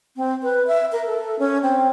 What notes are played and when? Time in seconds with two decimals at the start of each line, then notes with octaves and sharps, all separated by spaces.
0.17 C4
0.43 B4
0.67 E5
0.92 A#4
1.06 A4
1.39 C#4
1.63 C4